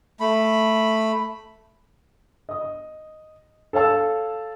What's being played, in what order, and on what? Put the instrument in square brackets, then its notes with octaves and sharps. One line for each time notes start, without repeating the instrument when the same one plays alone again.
[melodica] A3 B5
[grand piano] D#5 D#6
A4 C#5 F5 A5 E6